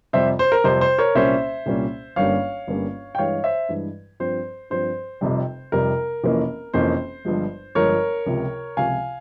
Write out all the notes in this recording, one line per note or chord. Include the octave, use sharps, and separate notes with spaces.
F2 C3 G3 C5 E5
C5
A#4
F2 C3 G3 C5
C5
A#4 C#5
C2 A#2 G3 A#3 C#4 C5 E5
C2 A#2 G3 A#3 C#4
G1 G2 G3 A#3 C#4 C#5 F5
G1 G2 G3 A#3 C#4
G5
G2 E3 G#3 C#5 F5
C5 E5
G2 E3 G#3
G2 F3 C4 C5
G2 F3 C4 C5
F1 F2 C3 G3
F1 F2 C3 G3 A#4
F1 F2 E3 A#3 C#4
F1 F2 E3 A#3 C#4 C5
G1 G2 F3 G#3
G1 G2 F3 G#3 A#4 C#5
C#2 C3 F3
C#2 C3 F3 F5 G#5